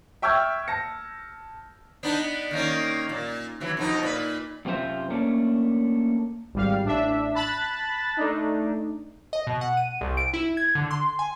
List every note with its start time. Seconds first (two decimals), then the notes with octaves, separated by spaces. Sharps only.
0.22 E5 G5 C#6 E6 F6 G#6
0.68 A5 A#6 C#7
2.03 B3 D4 D#4
2.51 D#3 A#3 C#4
3.09 A#2
3.60 E3 F#3
3.77 F2 B2 D#4
4.03 A#2 B4
4.65 F#2 C3 C4 F4 C5 E5
5.10 A3 A#3 C#4 D4
6.53 G#1 G3 F5
6.83 A1 D4 E5
7.34 A5 B5 F#6 A6
8.17 A3 D4 D#4
9.33 D#5
9.47 B2
9.61 F#5
9.77 D#7
10.01 C2
10.17 D7
10.34 E4
10.57 G#6
10.75 D3
10.91 C6
11.19 G#5